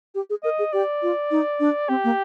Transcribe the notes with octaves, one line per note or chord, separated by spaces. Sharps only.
G4
G#4
A#4 D#5
G#4
G4 D5
F4
D#4
D4
C4 G4
A#3